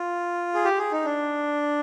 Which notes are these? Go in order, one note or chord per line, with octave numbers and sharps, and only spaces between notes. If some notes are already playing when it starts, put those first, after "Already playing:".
Already playing: F4
G#4
G4
G#4
D#4
D4